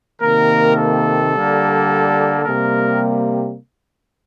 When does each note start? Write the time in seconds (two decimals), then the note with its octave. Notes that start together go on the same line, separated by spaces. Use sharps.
0.21 C3 D#3 A#3 A#4
0.77 A4
1.32 D3 G3 A#3
2.44 C3 G3 A#3 A#4